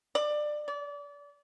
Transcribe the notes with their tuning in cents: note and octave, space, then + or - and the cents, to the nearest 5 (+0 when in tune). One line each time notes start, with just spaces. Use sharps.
D5 +20
D5 -30